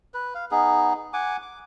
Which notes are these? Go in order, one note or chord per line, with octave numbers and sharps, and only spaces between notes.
B4
F5
B3 D#4 G#4
F#5 G#5 D6
D6